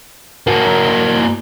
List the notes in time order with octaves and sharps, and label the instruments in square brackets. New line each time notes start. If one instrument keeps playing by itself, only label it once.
[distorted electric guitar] A#3 F#4